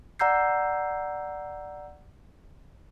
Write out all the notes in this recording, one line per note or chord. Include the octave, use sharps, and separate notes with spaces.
D5 F#5 A#5 E6 G6 C7